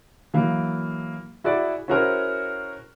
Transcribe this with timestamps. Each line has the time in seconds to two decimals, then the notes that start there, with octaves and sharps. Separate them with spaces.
0.34 E3 F#3 A#3
1.44 E4 F#4 G#4 D5
1.88 C#4 E4 F#4 G#4 A#4 C5